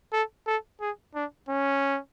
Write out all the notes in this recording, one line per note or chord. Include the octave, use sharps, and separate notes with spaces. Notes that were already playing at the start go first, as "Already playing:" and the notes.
A4
A4
G#4
D4
C#4